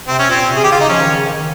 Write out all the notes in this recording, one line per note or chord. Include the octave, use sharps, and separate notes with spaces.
C3 C4
C#4
A#2 C4
C3
G#4
D#3 G4
C#3 F4
D#4
F3 C#4
D#3
C#3
D#3